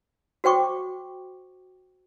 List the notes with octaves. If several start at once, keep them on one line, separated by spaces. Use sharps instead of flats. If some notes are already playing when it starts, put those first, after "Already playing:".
F#4 C5 G5 C#6 D6